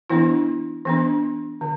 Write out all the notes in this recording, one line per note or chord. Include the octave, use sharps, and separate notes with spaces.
E3 B3 D4 E4
E3 B3 D4
D3